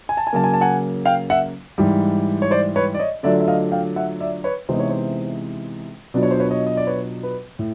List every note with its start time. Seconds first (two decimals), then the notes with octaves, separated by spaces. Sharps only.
0.09 G#5
0.17 A5
0.27 G#5
0.33 C#3 F#3 A#3 A5
0.44 G#5
0.53 A5
0.61 F#5 G#5
1.05 F5 G5
1.30 E5 F#5
1.78 G#2 E3 G3
2.42 C#5
2.51 C5 D5
2.76 B4 C#5
2.95 D5
2.99 C#5 D#5
3.23 D3 F#3 A3 D4 F4 D5 E5
3.40 E5
3.48 D#5 F5
3.72 F5 G5
3.96 E5 F#5
4.20 D5 E5
4.44 B4 C#5
4.69 C3 E3 G#3 B3 D#4 C5
4.79 C#5
4.89 C5
6.14 B2 F#3 B3 D4 F4 D5
6.23 C#5
6.31 C5
6.40 B4 C#5
6.51 C#5 D#5
6.67 D#5
6.77 D5
6.87 B4 C#5
7.23 B4
7.59 A2